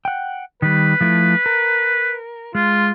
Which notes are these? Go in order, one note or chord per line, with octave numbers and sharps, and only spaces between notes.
F#5 G5
D#3 G3 B4
F3 A3 E4
A#4
G#3 F4